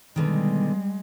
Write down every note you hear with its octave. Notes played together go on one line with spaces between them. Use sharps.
B2 D3 D#3 G3 G#3